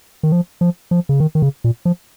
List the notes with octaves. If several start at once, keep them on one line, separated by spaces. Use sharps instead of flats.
D#3
F3
F3
F3
C#3
D#3
D#3
C#3
A#2
F3